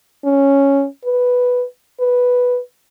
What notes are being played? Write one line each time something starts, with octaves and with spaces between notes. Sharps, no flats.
C#4
B4
B4